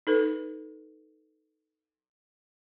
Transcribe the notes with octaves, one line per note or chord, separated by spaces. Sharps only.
D#4 A4 B4